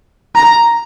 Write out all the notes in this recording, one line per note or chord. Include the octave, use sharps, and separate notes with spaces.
A#5